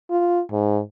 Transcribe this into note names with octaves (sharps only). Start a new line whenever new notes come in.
F4
G#2